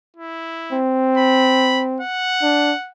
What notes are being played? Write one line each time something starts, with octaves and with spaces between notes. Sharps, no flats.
E4
C4
B5
F#5
D4